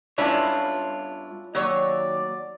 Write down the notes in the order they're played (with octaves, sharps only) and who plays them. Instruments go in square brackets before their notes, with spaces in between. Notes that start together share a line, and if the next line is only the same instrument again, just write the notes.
[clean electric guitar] G2 F4 C#5 [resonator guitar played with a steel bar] C#4 D4 E4
[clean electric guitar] D#2 [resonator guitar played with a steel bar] F#3 C#5 [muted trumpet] D5